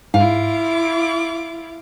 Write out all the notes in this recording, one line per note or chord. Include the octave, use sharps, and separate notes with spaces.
G#2 E4 F4 F5 D6